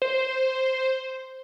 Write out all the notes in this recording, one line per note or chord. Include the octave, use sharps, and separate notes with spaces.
C5